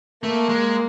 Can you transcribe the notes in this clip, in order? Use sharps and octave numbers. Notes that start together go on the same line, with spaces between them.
A3 A#3
G#3